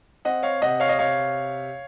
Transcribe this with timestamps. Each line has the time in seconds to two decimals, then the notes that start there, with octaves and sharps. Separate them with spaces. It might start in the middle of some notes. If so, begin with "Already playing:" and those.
0.25 C4 D#5 F#5
0.43 C#5 F5
0.62 C3 D#5 F#5
0.80 C#5 F5
0.89 D#5
0.99 C3 C#5 F5